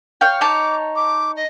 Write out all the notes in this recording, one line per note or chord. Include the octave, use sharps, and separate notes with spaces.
C#5 F5 G5
D#4 C#5 A5 D6
D6
D#5